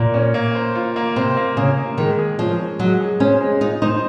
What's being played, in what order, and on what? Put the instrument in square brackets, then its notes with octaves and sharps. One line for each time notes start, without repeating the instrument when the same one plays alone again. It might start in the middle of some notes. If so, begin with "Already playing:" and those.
Already playing: [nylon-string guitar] A#2 [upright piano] A#3
[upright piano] C#4
A#3
C5
F4
A#3
[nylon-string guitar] C3 [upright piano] C5
[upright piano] A#3
[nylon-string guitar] C#3 [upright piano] A#3
[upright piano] A#3
[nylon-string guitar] D#3 [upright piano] G#3
[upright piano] G#4
[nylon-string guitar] F3 [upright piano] C#4
[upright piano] C#4
[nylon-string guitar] F#3 [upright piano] G#3
[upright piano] G#4
[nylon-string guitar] C#4 [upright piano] C5
[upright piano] G#3
[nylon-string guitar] D#4 [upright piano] F4
[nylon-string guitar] D#4 [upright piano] C5